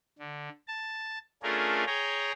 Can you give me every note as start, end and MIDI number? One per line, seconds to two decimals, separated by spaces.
0.19 0.49 50
0.67 1.18 81
1.43 1.84 57
1.43 1.84 61
1.43 1.84 62
1.43 1.84 65
1.43 1.84 68
1.43 1.84 70
1.87 2.32 68
1.87 2.32 73
1.87 2.32 79
1.87 2.32 82